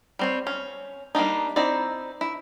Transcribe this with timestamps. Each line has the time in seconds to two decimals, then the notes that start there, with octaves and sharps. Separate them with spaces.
0.19 G3 C4 C#5
0.47 C#4
1.15 G3 A#3 D4 D#4
1.56 C4 D#4 E4 D5
2.21 E4